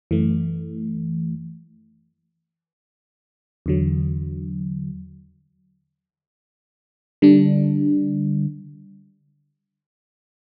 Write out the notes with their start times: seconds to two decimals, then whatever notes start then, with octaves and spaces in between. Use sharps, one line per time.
0.11 F#2 E3 A3
3.66 E2 D3 F#3
7.22 D3 G3 D4